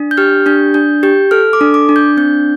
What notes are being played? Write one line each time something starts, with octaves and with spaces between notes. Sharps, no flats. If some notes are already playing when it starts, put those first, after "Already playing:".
Already playing: D4
G6
G4 F6
D4 G6
D4 G6
G4 G6
A4 F6
D6
D4
D6
D4
G6
C4 G6